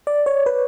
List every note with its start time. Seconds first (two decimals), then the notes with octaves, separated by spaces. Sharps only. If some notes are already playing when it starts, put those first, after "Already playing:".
0.07 D5
0.26 C#5
0.46 B4